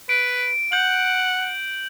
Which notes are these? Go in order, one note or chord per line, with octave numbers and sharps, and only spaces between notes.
B4 D7
F#5 G6 F#7